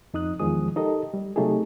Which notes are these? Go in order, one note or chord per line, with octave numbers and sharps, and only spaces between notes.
F2 D#4 D#6 F#6
E2 D#3 F3 G#3 G#4 D#6
D#4 G4 A4 A#4 D#5
G3
C3 F#3 A3 D#4 G4 G#4